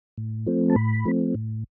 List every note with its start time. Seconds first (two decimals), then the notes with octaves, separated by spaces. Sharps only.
0.18 A2
0.47 F3 A3 C4
0.70 A5
0.76 A2 B5
1.06 F3 A3 C4
1.35 A2